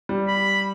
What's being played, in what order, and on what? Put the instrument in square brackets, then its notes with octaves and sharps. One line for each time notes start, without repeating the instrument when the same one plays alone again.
[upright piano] G3
[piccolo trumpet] B5